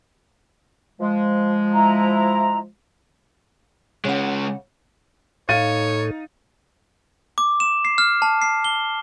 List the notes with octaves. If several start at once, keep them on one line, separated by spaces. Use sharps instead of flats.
F3 G#3
E4 A#5
C#3 G#3 C#4 F#5
A2 D#4 A4 C#5 F5 A6 D#7
D6
E7
C7
F6
A5
C7
G7